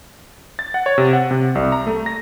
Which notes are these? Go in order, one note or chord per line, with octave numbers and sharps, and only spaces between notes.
A6
F#5
C#5
C3
F#5
C3
C2
A#5
A3
A#6